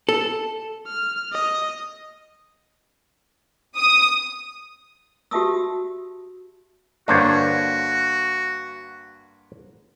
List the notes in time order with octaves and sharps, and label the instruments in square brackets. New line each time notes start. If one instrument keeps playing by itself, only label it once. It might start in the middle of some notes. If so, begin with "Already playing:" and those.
[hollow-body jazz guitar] A4
[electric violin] F6
D#5
[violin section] D#6
[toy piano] F#4 G4 E5 A5 D#6 E6
[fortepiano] G2 D3 A#3 [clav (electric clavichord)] D4 C5 C#5 [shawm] F#4